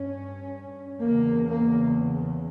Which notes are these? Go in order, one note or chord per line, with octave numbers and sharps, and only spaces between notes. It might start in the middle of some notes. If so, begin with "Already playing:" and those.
Already playing: G2 C#4
E2 C#3 A#3
A#3